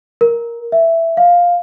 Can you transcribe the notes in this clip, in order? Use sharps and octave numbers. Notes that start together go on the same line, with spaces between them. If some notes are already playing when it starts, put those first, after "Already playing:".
A#4
E5
F5